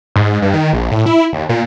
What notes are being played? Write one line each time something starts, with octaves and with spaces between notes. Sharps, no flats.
G#2
G2
D#3
A#1
A2
E4
D#2
A#2